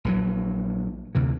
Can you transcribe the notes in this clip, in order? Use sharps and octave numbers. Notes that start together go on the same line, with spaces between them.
A#1 E3 F#3
D2 C3 E3